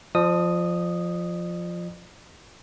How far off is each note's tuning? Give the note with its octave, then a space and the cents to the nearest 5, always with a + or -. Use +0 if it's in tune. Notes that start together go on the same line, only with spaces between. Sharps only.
F3 +0 D5 +45 D#6 +0